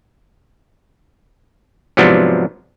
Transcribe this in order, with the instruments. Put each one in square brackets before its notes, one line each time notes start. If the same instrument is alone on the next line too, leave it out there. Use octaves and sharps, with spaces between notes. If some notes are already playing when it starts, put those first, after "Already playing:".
[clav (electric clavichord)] G#2 C3 F3 F#3 B3 D4